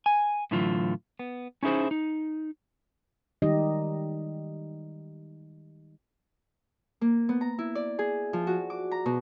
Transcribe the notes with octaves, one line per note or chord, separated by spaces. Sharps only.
G#5
A2 D3 E3 F#3 F4
B3
C#4 D#4 E4 G#4 C5
D#4
D#3 G3 G#3 D#4 G4 D#5
A#3
B3
A#5
E4
D5
G#4
F3
F#4
D6
A#5
B2